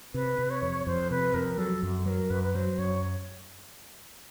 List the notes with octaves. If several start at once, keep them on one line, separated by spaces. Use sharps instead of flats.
C3 B4
C3
C#5
F2
F2 C5
C3 B4
F2 A#4
F#3 A4
F#2
F#3 A#4 B4
F#2 B4
B4
F#3 C5
F#2 C#5